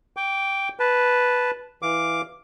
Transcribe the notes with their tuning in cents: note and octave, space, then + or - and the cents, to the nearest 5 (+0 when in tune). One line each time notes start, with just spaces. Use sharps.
G5 +0 D6 -30
B4 +0 A5 -10
E3 +0 F5 +0 D6 +0